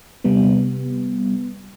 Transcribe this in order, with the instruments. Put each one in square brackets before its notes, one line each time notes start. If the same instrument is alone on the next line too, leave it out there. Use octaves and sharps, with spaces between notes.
[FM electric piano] C3 G3 B3